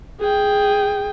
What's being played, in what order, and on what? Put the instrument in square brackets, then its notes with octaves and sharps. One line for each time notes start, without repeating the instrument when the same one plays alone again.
[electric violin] G#4 G5